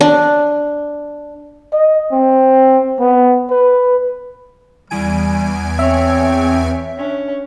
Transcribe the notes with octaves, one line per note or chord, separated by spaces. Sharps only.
D4
D#5
C4
B3
B4
E2 G3 G#5 D7
C4 C#5 E5
C#4 D4